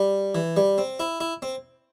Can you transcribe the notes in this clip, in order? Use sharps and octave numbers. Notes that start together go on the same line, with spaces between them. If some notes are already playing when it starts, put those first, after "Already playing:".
Already playing: G3
E3
G3
C4
E4
E4
C4